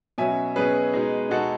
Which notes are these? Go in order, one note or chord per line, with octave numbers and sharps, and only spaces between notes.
B2 F#3 C#4 E5 G#5
B2 F#3 C#4 G#4 B4
B2 G#3 D#4
B2 G#3 D#4 F#4 A4